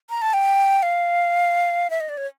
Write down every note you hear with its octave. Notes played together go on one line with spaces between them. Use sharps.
A#5
A5
G5
F5
E5
D#5
D5
C#5